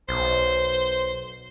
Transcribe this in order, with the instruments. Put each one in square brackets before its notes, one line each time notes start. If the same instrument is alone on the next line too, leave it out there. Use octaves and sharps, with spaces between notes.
[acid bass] B1 [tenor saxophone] C5